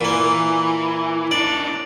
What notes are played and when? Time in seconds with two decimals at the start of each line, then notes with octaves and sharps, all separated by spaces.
0.01 A#2 E3 A#3
1.31 D4 D#4 D5